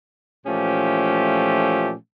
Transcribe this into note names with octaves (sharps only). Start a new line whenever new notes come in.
A#2 E3 F3 A3 C#4 G4